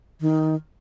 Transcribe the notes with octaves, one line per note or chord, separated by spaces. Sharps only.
D#3